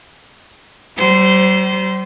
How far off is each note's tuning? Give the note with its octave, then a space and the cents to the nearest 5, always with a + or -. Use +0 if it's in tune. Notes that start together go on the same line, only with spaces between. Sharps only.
G3 -45 C5 -15